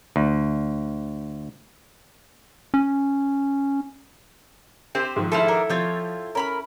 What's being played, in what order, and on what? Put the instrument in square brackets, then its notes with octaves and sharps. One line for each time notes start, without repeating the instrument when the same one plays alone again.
[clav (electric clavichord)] D2
[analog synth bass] C#4
[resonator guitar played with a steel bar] C4 G4 C5
[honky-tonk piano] G#2 D#3 F3
[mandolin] A3 C5 F6 [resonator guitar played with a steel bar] E4 A4
[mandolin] D4 A#4 F#5
[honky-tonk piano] F3 G6 A6 [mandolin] C4 F4 C#5
[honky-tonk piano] C#4 [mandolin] A#4 B5 F6